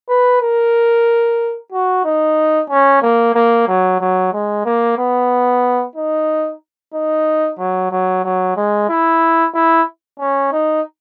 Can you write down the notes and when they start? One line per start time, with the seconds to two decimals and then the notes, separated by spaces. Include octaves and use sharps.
0.09 B4
0.41 A#4
1.72 F#4
2.04 D#4
2.69 C#4
3.02 A#3
3.35 A#3
3.67 F#3
4.00 F#3
4.33 G#3
4.65 A#3
4.98 B3
5.95 D#4
6.94 D#4
7.59 F#3
7.91 F#3
8.24 F#3
8.57 G#3
8.89 E4
9.54 E4
10.19 C#4
10.52 D#4